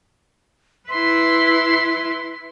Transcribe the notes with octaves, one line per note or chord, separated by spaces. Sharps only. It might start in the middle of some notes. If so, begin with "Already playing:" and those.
E4 B4 C6